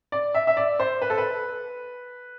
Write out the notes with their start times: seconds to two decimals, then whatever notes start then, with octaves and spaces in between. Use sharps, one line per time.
0.12 D5
0.34 E5
0.47 E5
0.57 D5
0.80 C5
1.02 B4
1.10 A4
1.18 B4